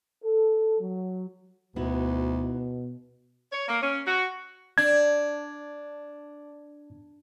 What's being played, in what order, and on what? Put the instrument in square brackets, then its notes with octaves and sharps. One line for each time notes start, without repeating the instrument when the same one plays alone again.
[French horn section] A4
F#3
[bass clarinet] D2 [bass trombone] B2 [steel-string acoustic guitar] B3 D#4 E4
[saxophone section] C#5
A#3
C#4
F#4
[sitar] D4 [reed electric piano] G#6